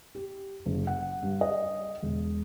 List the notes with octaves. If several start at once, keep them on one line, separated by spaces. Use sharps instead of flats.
G4
F#1
F#5
G2
D#5
E1